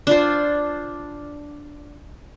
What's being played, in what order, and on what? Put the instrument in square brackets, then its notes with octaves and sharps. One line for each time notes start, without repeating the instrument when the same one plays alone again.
[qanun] D4 F4 C5